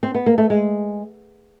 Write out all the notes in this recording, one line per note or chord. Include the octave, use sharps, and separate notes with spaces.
C4
B3
A#3
A3
G#3